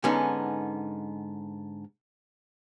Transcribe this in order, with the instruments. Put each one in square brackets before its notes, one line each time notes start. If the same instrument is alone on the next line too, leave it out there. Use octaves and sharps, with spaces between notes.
[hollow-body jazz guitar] G#2 D3 B3 C#4 D#4